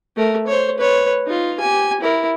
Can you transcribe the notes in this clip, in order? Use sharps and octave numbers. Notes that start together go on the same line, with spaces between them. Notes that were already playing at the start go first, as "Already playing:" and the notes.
A3 A#4
C5 C#5
B4 C#5
D#4 F4
G4 G#5
E4 A#4